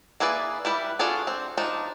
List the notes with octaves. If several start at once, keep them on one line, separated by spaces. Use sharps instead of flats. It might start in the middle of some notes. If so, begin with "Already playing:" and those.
A#3 E4 G#4 B4 D5
G3 E4 B4
D4 F4 F#4 G#4 A4
C4
F3 D4 D#4